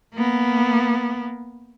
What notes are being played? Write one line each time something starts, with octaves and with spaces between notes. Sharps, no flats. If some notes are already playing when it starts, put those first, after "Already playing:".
A#3 B3